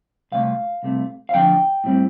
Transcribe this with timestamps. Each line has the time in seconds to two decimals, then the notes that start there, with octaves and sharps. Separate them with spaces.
0.32 C2 C3 A3 F5
0.83 C2 C3 A3
1.29 F5
1.34 D2 D3 F3 D4 G5
1.84 A2 G3 C4